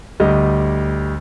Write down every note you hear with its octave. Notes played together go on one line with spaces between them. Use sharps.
D2 G3 D#5